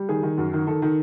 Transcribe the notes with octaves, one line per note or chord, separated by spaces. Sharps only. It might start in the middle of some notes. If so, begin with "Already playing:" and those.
Already playing: G3
D#3 G#4
D#3
F#2
D#3
D#3 A4
D#3